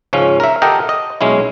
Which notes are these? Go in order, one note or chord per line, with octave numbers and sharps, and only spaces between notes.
C#2 G#2 F3 C#4
A#4 E5
G4 A4 A#4 D#5 F#5 G5
D#5
B1 G#3 C#4 E4